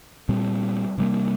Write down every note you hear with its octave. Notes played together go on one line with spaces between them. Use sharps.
A#2 G3 C4
C3 G3 A#3